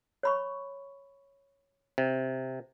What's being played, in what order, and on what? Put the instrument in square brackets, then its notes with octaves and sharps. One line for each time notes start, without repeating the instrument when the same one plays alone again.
[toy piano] C#5 B5 C#6
[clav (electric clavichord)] C3